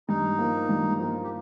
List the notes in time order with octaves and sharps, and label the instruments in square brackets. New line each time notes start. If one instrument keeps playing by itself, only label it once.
[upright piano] G2 [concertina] D#4
[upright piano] F3 A#3
G2
F3 A#3
[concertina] G4